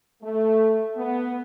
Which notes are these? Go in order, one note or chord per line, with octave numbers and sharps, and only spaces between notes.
A3
B3